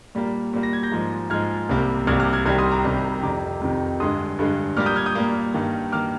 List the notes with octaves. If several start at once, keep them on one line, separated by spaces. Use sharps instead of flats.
A#2 G3 A#3
A#2 G3 A#3
A#6
G#6
G6 A#6
G#2 F3 G#3
G#2 F3 G#3 F6 G#6
C2 C3 G3 A#3
C2 C3 G3 A#3 F6 G#6
D6 F6
F6 G#6
C2 C3 D#3 G3 F6 G#6
C6 D#6
A#5 D6
C2 C3 D#3 G3
F2 C3 D#3 A#5 D6
F2 C3 D#3
G2 D3 G#3 C6 D#6
G2 D3 G#3
A#2 G3 A#3 D6 F6
D#6 G6
F6 G#6
D#6 G6
A#2 G3 A#3
G2 D#3 A#3
D#3 A#3 D6 F6